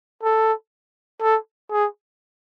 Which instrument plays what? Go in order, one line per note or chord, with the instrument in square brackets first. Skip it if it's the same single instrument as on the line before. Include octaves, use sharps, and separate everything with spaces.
[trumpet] A4
A4
G#4